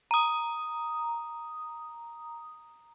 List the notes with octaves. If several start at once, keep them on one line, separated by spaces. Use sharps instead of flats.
A#5 D#6